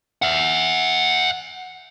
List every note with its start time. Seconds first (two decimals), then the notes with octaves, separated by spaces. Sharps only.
0.22 E5 F#5